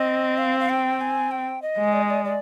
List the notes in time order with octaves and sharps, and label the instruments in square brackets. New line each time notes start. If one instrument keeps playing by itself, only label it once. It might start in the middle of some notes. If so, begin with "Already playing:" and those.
Already playing: [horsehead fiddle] C4 [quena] D#5
[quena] F5
F5
G5
G#5
G5
D#5
[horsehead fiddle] G#3
[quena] D5
D#5
D5
D5